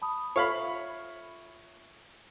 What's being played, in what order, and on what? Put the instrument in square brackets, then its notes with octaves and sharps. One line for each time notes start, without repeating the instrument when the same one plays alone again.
[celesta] A5 B5 D#6
[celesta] F4 A4 E5 [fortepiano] C#5 F5 B5